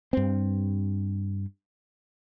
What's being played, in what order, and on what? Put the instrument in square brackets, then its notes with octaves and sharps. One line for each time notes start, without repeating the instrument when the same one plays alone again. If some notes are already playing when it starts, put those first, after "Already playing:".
[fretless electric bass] G2 C4